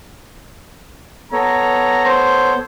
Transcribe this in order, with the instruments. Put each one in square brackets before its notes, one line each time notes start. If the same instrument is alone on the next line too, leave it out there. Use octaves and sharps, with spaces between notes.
[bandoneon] B3 A4 C#5 [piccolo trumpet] A#5
[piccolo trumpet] C5